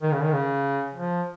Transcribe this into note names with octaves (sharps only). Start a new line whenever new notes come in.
D#3
C#3
D#3
C#3
F3